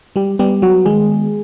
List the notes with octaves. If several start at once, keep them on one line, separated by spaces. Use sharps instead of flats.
G3 G4
G3 B3 G4
F#3 F#4
D#3 G#3 G#4